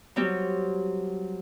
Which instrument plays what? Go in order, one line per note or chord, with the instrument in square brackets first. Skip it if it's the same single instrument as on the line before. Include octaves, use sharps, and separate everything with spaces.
[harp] F#3 G3 C4